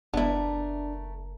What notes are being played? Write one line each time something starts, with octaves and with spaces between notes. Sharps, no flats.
F#1 A3 B3 D4 E4 A#4